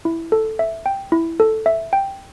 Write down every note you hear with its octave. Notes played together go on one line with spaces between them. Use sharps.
E4
A4
E5
G5
E4
A4
E5
G5